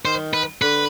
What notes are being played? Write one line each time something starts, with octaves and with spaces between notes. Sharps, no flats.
D#3 C5
B4
D3 B4